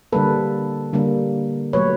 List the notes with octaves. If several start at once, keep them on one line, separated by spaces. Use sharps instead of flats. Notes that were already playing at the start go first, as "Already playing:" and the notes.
D3 G3 A#3 A4 B4
D3 G3 A#3
B2 F#3 A3 B4 C#5